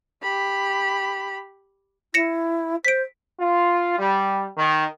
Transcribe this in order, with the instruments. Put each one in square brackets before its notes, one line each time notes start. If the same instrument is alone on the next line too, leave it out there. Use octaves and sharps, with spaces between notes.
[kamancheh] G4 B5
[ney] E4 [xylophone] A#6 C#7 E7
[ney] C5 [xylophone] B6 D7
[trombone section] F4
G3
D#3